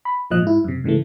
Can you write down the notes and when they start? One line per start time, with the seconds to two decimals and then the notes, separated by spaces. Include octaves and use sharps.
0.05 B5
0.31 G#1 G2 A#2 F3 D#5 F#6
0.42 G#2 E4
0.64 F#2 C3
0.84 G#2 C#3 E3 A3